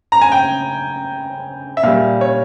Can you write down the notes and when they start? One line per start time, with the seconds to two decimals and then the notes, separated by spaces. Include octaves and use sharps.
0.12 A#5
0.22 G#5
0.32 G5
1.77 E5
1.83 A#2 G3 F5
2.21 C#5